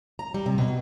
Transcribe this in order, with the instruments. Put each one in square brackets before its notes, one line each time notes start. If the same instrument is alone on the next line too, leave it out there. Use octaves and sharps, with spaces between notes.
[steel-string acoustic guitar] A#5
G3
C3
B2